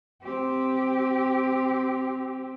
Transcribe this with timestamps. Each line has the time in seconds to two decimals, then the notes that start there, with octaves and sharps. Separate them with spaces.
0.23 C4 G4